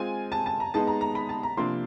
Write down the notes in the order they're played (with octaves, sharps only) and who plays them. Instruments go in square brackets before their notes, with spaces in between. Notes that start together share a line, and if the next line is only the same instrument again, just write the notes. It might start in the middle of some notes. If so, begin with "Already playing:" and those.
Already playing: [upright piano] G#3 C4 F4 [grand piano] G#5
[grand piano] A5
A5
A#5
[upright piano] G#3 B3 D#4 G#4 [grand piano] A5
[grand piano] A#5
A#5
B5
A5
A#5
[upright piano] C3 F3 A#3 D4 [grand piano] C6